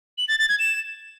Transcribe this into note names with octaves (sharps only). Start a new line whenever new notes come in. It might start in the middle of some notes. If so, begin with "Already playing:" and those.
F#7
A6
A6
G#6
E7